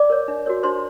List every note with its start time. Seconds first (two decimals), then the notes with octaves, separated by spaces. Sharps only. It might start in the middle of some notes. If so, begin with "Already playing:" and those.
Already playing: D5 D6
0.10 A#4 C#5
0.28 D4
0.46 F#4 A#4 C#5
0.63 D4 C5 C6